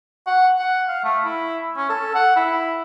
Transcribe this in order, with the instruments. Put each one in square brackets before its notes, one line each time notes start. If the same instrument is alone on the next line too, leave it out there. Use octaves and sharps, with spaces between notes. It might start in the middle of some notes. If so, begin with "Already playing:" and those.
[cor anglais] F#5
F#5
F5
A3
E4
C#4
A4
F#5
E4